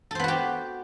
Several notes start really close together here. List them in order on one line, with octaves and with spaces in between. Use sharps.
A4 C5 B3 F#4 G4